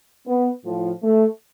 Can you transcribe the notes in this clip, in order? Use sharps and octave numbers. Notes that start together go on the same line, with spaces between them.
B3
A2 F3
A3